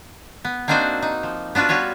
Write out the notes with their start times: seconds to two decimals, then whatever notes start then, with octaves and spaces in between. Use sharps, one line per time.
0.45 B3
0.68 A#3 C4 D4 D#4 F#4 C5
1.02 D#4
1.23 F3
1.55 B3 D4 F4 F#4 B4
1.69 G3 F4 F#4 B4 C#5